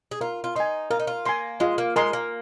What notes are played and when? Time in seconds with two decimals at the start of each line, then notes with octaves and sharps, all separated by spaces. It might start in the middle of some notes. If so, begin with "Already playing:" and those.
0.11 G#4
0.21 F4 A#4
0.44 F4
0.56 D#4 G#5 C6
0.91 F4 A#4
1.00 D#4
1.07 F4
1.25 A#3 G#5 C6
1.60 G#3 F4
1.78 A#3
1.96 G#3 A#4 G#5 C6
2.13 A#3